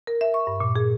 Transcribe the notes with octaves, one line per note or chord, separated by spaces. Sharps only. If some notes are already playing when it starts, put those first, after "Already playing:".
A#4
E5
C#6
G2
A#2
G#4